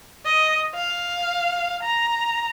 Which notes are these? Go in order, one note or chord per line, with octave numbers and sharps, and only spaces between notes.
D#5
F5
A#5